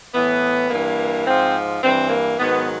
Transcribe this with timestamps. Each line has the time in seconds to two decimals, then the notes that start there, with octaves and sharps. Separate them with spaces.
0.14 A2 E3 B3
0.70 G2 E3 A#3
1.26 G#2 F3 C4
1.83 G2 E3 C4
2.10 A#3
2.38 G#2 D#3 F#3 B3